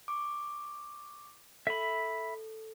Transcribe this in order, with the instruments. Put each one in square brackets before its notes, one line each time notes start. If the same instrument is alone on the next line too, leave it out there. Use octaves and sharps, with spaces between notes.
[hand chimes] C#6 D6
[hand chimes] A4 [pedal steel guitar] E5 B5